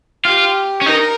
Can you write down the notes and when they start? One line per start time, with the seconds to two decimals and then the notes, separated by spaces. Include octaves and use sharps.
0.25 F4 G4
0.81 C#4
0.86 D#4 A#4